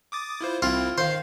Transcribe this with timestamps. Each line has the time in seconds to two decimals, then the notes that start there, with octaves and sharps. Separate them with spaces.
0.12 D6 D#6 A6
0.41 E4 F4 C5
0.62 C2 C4 E4 F4
0.98 D#3 C5 F5